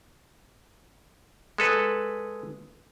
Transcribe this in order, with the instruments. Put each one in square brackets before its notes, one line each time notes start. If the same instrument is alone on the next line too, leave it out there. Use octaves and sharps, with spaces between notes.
[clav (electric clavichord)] G#3 A4 B4